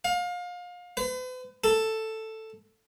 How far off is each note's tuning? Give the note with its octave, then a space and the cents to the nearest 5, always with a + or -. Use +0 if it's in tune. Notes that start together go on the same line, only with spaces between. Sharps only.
F5 +30
B4 +45
A4 +5